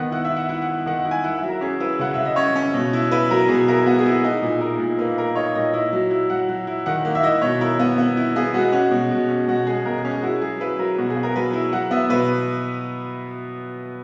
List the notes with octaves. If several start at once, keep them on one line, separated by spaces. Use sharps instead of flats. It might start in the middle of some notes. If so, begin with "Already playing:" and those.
Already playing: D#3 B3 F#5
E4 F#5
E5
E4
F#5
E4 F#5
F#5
E4
D#3 F#5
F#5
E4
G#5
E4 F#5
E5
F#3
A#4
C#4 G#4
E4 B4
C#3 F#5
C#3 E5
D#5
C#4 C#5
C#4
B2
E4
E4 B4
F#3 A#4
B2 G#4
E4 A#4
B3 F#4
G#4
E4
G#4
D#4 G#4
A#2
D#4 A#4
A#2
A#3 B4
A#3 A#4
D#4 C#5
A#2 D#5
E4 D#5
F#3
E4
F#3 F#5
F#3
E4
D#3 F#5
A#3
E5
E4 D#5
B2 C#5
E4 A#4
B3
B3
E4
B3 G#4
G#3 F#4
C#4 F#4
B2
B2
C#4
B2 F#4
G#3 G#4
B2 A#4
G#4
C#4
G#4
E4 F#4
F#3 G#4
E4 B4
F#3 A#4
B2 F#4
G#4
B3
A#4
F#3 B4
E4
F#3 F#5
B3 E5
B2 B4